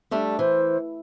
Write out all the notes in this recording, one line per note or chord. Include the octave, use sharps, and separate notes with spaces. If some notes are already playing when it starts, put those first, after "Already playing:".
G3 A3 D4
E3 C5